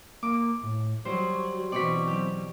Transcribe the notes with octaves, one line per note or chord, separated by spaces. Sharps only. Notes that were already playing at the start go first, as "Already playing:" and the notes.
A#3 D6
A2
F#3 G3 F#4 C5
B2 E3 C4 D5 C#6 B6
F#3 G4